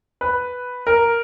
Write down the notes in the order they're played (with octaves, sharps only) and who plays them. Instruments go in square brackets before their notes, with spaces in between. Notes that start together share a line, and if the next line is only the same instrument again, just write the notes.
[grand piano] B4
A#4